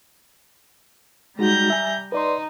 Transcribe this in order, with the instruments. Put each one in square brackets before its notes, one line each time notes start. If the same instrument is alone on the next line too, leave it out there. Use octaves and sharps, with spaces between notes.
[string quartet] G3 A#5 G6 [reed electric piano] G#3 D#4 F#4
[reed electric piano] E5 G#5
[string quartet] D#4 [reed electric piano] B4 D5 C6